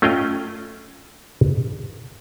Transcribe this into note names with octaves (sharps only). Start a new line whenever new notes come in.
A3 C#4 F4 D#5 F5 G5